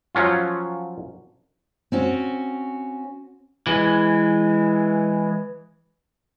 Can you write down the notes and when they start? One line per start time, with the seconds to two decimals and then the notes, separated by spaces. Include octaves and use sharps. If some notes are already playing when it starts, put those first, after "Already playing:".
0.15 F3 F#3 C#4 F4
1.92 C4 C#4 F#4
3.67 E3 G#3